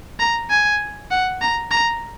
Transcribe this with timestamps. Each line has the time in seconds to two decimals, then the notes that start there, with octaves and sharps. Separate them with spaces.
0.19 A#5
0.50 G#5
1.11 F#5
1.41 A#5
1.71 A#5